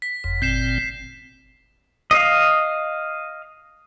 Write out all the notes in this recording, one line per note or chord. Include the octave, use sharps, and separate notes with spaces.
B6
F#1 F2
G1 A#2 C4 G6 C7 E7
D#5 F5